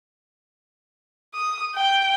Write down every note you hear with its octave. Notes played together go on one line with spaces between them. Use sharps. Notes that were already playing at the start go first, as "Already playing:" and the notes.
D#6
G5